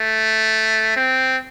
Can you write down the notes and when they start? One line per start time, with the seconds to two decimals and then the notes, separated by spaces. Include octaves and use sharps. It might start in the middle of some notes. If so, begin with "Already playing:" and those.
Already playing: A3
0.96 C4